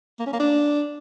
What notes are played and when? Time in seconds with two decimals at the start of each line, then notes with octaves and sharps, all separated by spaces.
0.20 A#3
0.26 C#4
0.33 A#3
0.40 D4